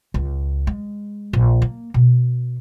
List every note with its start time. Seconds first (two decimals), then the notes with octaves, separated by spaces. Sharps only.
0.14 C#2
0.67 G#3
1.33 A#1
1.62 A#3
1.94 B2